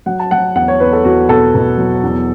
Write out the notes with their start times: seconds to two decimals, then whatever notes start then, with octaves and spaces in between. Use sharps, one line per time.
0.06 F#3 F#5
0.19 A5
0.31 F#3 F#5
0.55 E2 F#5
0.68 C#5
0.80 E2 B4
0.93 A4
1.05 E2 F#4
1.29 B2 A4
1.54 B2
1.78 F#3
2.04 E2